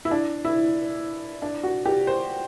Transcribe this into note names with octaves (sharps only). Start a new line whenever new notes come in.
E4
D4
E4
D4
F#4
G4
C5